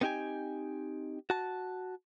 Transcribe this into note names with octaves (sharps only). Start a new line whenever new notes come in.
B3 C4 D#4 G4 G5 G#5
F#4 A5